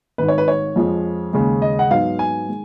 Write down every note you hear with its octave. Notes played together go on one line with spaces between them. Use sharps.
G#1 G#2 D#3 B4
C#5
B4
C#5
F2 F3 G#3
D#2 C#3 G#3
D#5
F#5
G#2 F#3 B3 D#4 F5
G#5
D#3 G#3